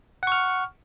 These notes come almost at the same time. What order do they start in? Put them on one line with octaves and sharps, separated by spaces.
F#5 C#6 F6